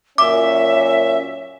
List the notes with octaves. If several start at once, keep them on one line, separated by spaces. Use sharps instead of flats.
F#2 A#2 C#4 E5 D6